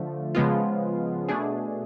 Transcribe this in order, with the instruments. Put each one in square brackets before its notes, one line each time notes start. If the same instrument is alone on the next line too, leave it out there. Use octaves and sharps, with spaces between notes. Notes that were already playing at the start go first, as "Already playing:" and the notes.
Already playing: [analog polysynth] D3 F3 A3
C#3 F3 G#3 B3 F4
B2 A3 D4 G#4